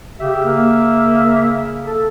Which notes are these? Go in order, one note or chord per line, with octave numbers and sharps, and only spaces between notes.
C#3 G4 E5
A#3
A4